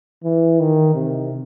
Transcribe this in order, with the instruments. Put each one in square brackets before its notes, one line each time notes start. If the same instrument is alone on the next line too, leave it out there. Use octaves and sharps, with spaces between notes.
[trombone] E3
D#3
C3